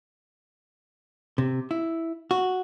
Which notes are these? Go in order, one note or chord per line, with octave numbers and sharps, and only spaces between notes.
C3
E4
F#4